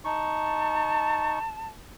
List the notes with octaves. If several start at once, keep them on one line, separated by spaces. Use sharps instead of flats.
D#4 A5 C#6